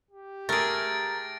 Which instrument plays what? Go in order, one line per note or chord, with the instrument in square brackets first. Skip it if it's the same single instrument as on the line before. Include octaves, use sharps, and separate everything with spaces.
[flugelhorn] G4
[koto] A3 G#4 [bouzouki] A#4 [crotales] A6 A#6 D7